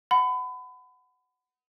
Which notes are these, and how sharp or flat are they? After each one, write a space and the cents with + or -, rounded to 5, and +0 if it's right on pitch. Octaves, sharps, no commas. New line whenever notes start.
F#5 +0 B5 +30